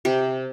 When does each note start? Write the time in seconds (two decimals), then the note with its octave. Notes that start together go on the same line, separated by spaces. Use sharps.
0.05 C3 G4